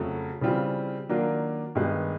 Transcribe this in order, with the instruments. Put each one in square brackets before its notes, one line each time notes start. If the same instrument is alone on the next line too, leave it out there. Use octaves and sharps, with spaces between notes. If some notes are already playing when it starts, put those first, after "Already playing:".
Already playing: [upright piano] F2 C#3 F#3 A3
C#3 E3 G3 C4 F4
D#3 F#3 A#3 D4 F4
G2 D#3 G#3 B3